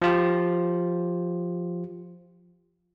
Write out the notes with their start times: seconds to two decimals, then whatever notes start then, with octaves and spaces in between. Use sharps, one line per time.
0.02 F3 F4 G4